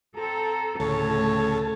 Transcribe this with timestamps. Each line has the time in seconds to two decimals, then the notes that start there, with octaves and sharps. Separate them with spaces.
0.17 C4 A4 A#5
0.80 D2 A2 C#3 A4 C#5 A5